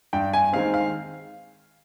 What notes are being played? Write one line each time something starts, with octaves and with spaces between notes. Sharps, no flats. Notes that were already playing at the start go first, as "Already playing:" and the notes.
G2 G5
G#5
D#3 G#3 C4 F5
F5